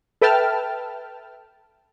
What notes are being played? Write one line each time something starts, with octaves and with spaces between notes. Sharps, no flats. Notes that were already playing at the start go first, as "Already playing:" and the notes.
A4 B4 E5 G5 A5 F6